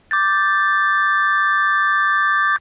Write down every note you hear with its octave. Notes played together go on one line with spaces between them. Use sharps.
D6 G6 A6